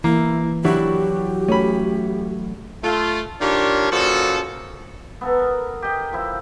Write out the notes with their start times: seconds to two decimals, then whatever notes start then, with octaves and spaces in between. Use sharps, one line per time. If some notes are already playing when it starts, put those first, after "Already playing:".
0.04 E3 A#3 E4
0.64 F#3 G3 D4 E4 F#4 G4
1.49 A3 C#4 B5
2.83 A3 F4
3.41 D#3 D4 F4 G4 C#5
3.91 A#2 C#3 F3 F#4 A4
5.21 B3 A4 A#5
5.39 A#4
5.82 G4 D#5
6.13 F3 E4